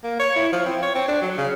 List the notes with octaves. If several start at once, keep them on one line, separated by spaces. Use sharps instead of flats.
A#3
C#5
E4
F3
C4
C#5
C4
D4
F#3
C#3